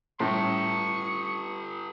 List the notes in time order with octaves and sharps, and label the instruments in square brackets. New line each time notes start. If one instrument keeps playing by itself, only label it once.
[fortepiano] A2 [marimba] G3 C#4 [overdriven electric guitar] G4 A4 [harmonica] C#6